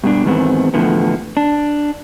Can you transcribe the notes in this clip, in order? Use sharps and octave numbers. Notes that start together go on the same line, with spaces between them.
G2 B2 D4
E2 G#2 D#3 B3 C4
E2 A2 D3 F3 B3
D4